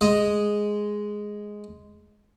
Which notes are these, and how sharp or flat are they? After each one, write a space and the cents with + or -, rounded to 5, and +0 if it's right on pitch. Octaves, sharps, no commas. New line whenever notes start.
G#3 +0 D#5 +0